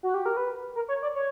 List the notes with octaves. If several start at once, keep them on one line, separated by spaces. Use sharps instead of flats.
F#4
G4
A#4
B4
A#4
C#5
D5
C#5